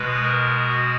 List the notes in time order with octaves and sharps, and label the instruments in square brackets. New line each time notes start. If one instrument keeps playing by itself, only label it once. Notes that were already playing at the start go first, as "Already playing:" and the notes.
Already playing: [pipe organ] B2 G#3 B4
A#4
F#4